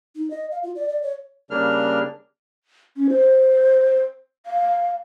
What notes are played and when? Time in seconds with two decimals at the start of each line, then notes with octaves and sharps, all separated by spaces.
0.15 D#4
0.31 D#5
0.51 F5
0.63 F4
0.76 D5
0.89 D5
1.02 C#5
1.50 C#3 G3 A#3 D4 F6
2.96 C#4
3.10 C5
4.46 F5